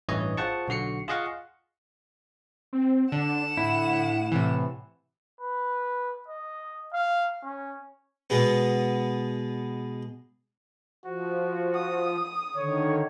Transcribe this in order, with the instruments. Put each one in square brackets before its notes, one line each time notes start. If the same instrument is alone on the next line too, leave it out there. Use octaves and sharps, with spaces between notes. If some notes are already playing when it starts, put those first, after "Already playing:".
[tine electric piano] A1 G2 E3 C#5 D#5
F4 G#4 C5 F#5 A5 C#6
B1 D3 F#4 C7 C#7
F4 G#4 D#5 F5 F#5 C#6
[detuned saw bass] C4
[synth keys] D3 [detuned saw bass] D4 [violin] F#5 E7
[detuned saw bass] A2 [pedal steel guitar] E4
[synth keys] A2 C3 E3
[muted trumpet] B4
D#5
F5
C#4
[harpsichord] B2 G#3 B3
[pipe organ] F3 [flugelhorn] F#4
[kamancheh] D#6
[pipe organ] D3 D#3 [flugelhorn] C#5